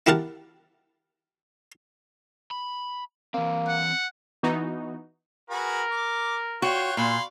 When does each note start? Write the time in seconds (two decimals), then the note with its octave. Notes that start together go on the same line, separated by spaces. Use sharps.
0.06 E4 G4 A#4 F#5 A5
2.51 B5
3.34 E3 A#3 C4
3.68 F#5
4.43 E3 B3 D#4 F#4
5.50 F#4 G#4 A#4 B4
5.91 D6
6.62 F4 F#4 C#5 G5
6.97 A#2 F5 B5 C6